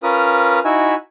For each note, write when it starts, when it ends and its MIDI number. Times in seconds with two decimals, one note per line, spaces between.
0.03 0.60 61
0.03 0.60 65
0.03 0.60 70
0.03 0.60 71
0.03 0.60 87
0.65 0.95 63
0.65 0.95 64
0.65 0.95 66
0.65 0.95 76
0.65 0.95 80